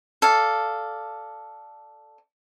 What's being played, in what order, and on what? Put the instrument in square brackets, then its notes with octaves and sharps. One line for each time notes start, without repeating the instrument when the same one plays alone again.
[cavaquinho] A4 D5 F5